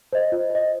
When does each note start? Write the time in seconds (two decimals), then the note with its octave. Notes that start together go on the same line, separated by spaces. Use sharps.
0.13 C5 D#5
0.32 F4
0.50 C5 D#5